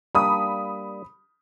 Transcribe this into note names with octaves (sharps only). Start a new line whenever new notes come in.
G3 A#3 D4 B5 D#6